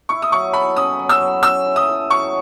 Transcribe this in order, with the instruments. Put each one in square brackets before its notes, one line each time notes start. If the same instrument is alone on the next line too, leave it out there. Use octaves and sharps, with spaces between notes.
[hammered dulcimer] E4 [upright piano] C#6
[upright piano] D#6
[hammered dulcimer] F#3 [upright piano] C#6
[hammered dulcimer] A4 [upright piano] B5
[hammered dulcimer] C#4 [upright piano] D#6
[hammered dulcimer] F#3
[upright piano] E6
[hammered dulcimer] F#3
[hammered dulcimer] C#4 [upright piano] E6
[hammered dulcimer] E4
[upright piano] D#6
[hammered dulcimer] A4
[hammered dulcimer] F#3 [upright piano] C#6